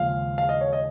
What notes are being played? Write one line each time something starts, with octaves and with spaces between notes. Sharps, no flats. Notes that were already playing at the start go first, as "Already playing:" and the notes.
Already playing: D#2 C#3 F3 G#3 F5
F5
D#5
C#5
D#5